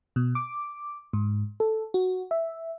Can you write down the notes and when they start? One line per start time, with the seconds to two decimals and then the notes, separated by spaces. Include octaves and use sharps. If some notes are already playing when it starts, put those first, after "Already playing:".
0.16 B2
0.35 D6
1.13 G#2
1.60 A4
1.94 F#4
2.31 E5